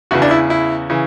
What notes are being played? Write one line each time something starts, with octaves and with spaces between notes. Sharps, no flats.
E2 C#3 E3 F#4
D4
E4
E4
C#3 E3